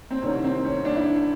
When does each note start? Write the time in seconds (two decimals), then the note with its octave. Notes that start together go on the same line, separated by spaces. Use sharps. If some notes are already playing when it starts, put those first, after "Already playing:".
0.11 C4
0.22 C2 C3 D#3 C#4
0.44 C4
0.65 C#4
0.85 D4
0.96 E4